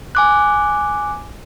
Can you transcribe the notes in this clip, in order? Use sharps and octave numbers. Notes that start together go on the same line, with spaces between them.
G#5 D6 F#6